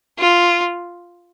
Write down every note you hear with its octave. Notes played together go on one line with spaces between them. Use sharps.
F4